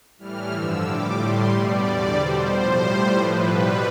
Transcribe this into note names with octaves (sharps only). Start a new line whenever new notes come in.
A2 E3 G3 F6
G2 D3 F3 E6
A2 G3 D6
A2 G3 C6
B2 G3 D5
E2 D3 G3
B2 G3 C5
A2 F3
A2 G3
A2 F3 B4
B2 G3 B4